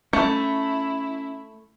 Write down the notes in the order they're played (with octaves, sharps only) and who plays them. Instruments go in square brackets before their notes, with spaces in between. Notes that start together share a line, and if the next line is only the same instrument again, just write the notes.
[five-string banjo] A3 [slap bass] C#4 [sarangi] E4